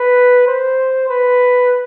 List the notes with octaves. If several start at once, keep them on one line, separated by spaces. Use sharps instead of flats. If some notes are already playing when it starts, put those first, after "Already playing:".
Already playing: B4
C5
B4